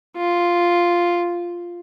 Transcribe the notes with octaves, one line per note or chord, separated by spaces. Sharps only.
F4